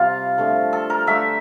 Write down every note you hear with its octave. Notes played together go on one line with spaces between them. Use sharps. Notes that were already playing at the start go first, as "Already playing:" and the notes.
Already playing: C3 G3 F4
D3 F3 A3
A4
A#4
D3 A3 E5